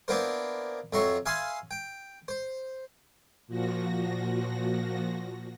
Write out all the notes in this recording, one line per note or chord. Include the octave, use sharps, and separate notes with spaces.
A#3 B3 D4 E4 A#4 C5
F2 F#3 E5 A#5 C6 C#6
E5 F5 G#5 B5 C6 D#6
G5
C5
A#2 F3 F#4 A#6